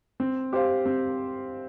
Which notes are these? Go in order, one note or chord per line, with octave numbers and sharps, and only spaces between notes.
C4
G4 C5 F5
C4